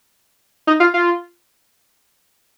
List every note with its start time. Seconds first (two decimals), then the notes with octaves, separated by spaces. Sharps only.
0.67 D#4
0.80 F4
0.94 F4